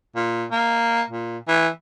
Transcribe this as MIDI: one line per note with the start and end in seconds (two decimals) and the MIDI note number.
0.16 0.46 46
0.51 1.02 58
1.10 1.38 46
1.48 1.68 52